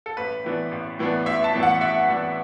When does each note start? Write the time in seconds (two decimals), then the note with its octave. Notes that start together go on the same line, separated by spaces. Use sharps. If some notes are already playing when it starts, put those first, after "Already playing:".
0.06 A4
0.17 A1 B4
0.44 A2 E3 B3 D4
0.71 A1
0.99 A2 E3 B3 D4
1.26 A1 E5
1.44 A5
1.54 A2 E3 B3 D4
1.63 F#5
1.81 A1 E5
2.08 A2 E3 B3 D4